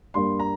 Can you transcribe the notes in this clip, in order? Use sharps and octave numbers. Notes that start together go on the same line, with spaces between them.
G2 G3 A#3 C6
A#5